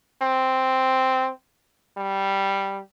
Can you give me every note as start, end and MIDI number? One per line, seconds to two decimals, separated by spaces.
0.22 1.30 60
1.97 2.80 55